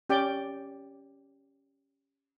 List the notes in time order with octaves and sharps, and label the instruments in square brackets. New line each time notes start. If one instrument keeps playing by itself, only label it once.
[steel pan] C#4 G4 D5 G5